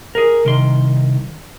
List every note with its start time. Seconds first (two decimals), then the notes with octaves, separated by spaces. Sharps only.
0.15 G#4 A#4
0.45 C2 D#3 C6